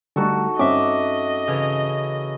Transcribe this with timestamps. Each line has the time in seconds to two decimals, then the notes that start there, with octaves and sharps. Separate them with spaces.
0.16 D3 G3 A3 D#4 F#4 A4
0.59 G2 C4 C#4 D#5 E5 D6
1.48 C#3 E3